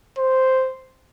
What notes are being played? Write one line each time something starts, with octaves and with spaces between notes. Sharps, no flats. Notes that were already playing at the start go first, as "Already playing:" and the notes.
C5